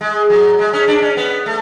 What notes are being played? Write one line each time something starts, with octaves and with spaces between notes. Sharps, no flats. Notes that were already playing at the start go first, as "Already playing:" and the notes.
G#3
F#3
G#3
C#4
D4
C#4
B3
A3